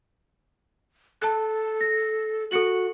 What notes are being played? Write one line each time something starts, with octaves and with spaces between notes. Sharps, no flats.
A4 A5 F#6
A#6
F#4 A4 C#7 F#7